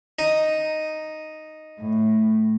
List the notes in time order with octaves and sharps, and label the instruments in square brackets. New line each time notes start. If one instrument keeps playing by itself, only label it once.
[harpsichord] D#4
[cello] A2